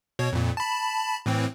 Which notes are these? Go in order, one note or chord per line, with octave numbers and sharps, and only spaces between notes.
B2 C#5
F2 A#2
A5 B5
A2 E3 C4